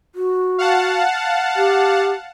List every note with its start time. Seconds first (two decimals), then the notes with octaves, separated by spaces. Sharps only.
0.15 F#4
0.58 F5 F#5 A5
1.56 G4